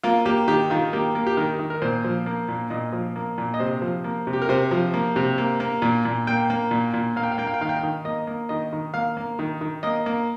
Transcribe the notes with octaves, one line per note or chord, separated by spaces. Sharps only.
A#3 F4
A#3 G4
D#3 G4
D#3 F4
A#3 G4
A#3
G4
D#3 A#4
D#3
A#4
A#2 C5
F3
A#3
A#2
A#2 D#5
F3
A#3
A#2
D#5
C3 C5
F3
A#3
C3
G4
A#4
C3 C5
F3
A#3
C3
A#3
A#3
A#2
A#2
A#3 G5
A#3
A#2
A#2
A#3 F5
G5
F5
A#3 G5
F5
G5
D#3 F5
G5
F5
D#3
A#3 D#5
A#3
D#3 D#5
D#3
A#3 F5
A#3
D#3
D#3
A#3 D#5
A#3